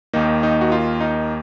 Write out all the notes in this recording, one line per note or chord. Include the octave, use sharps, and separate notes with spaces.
D#2 D#3 A#3 D#4
D#4
F#4
F4
D#4